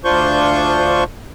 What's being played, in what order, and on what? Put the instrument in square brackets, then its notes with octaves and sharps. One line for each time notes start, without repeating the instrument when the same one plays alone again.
[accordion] D2 D4 F4 C5 C#6 G6